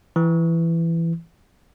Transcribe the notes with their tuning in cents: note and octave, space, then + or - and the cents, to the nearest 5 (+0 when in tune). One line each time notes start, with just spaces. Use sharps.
E3 +15